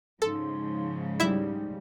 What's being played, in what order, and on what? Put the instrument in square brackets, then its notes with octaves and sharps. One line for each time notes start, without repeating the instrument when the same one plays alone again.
[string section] G#2 C#3 F3 [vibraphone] D#4 C6 [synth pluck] A4
[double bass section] G3 [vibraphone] D#4 [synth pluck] E4 E5